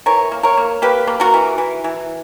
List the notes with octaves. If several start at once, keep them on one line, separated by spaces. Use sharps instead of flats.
E3 A#4 C#5
A#3
A#4 C#5
A#3
A#3 G4 B4
A#3
F#4 A#4
E3
E3
E3